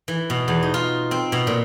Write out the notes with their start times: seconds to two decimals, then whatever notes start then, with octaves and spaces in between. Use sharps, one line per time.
0.08 E3
0.30 B2
0.48 E2
0.63 D#4
0.74 F4
1.11 C4
1.32 B2
1.47 A#2